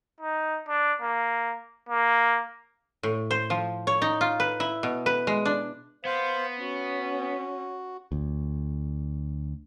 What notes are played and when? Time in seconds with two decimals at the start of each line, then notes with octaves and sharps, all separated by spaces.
0.21 D#4
0.69 D4
1.02 A#3
1.89 A#3
3.03 A2
3.31 C5
3.50 F3
3.87 C#5
4.02 D#4
4.21 F4
4.40 B4
4.60 E4
4.83 B2
5.06 B4
5.27 G#3
5.45 D4
6.05 B3 C5 F5
6.61 C#4 F#4
8.12 D2